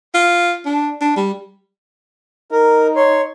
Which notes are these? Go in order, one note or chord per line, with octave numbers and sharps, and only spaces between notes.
F4
D4
D4
G3
D#4 A#4
C#5 C6